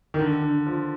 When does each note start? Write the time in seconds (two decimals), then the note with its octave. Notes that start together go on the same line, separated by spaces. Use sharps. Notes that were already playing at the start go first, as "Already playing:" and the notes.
0.14 D#3
0.19 D3
0.42 D3
0.67 F3